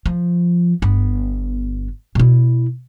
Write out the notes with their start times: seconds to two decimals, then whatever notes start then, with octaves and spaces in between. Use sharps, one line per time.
0.06 F3
0.82 G1 B3
2.15 B2 E4